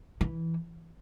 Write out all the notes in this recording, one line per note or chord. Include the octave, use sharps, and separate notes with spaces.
E3